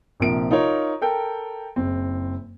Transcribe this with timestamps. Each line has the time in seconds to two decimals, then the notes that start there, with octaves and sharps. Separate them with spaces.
0.20 A#1 C3 F3 A#4 D7
0.51 D#4 F4 A#4 C#5
1.01 A4 A#4 G5
1.76 F#1 C4